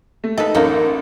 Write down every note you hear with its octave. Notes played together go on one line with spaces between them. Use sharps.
A3
D#4 A4 B4
A1 F#3 A#3 D#4